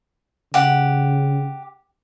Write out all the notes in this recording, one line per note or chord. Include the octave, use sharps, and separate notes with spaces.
C#3 G4 F#5